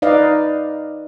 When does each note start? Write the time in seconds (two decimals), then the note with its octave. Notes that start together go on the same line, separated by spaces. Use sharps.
0.02 D#4 B4 D5 D#5 F5